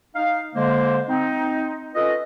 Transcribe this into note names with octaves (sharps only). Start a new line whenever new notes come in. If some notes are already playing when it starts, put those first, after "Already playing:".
D#4 F5
D3 G#3 A#3 C5
C4 D#4
C#4 F4 A4 B4 D#5